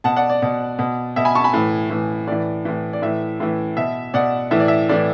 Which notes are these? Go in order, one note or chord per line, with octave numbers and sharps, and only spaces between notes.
B2 F#5 A5
D5 F#5
D5
B2
B2
B2 E5
G#5 B5
A5 C#6
G#5 B5
A2 E3
A2 E3
A2 E3 D5
A2 E3
D5
A2 E3 E5
A2 E3
B2 E5
B2 D5 F#5
A2 E3 E5
D5
E5
A2 E3 D5